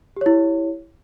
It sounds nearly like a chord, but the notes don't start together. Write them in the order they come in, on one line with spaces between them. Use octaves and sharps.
G4 C#5 E4